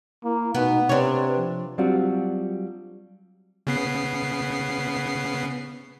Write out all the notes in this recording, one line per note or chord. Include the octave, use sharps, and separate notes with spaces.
A#3 E4
B2 B3 D#4
C3 D4 B4 C#5
F3
F#3 G3 C4 D4 F4 F#4
C#3 B3 C7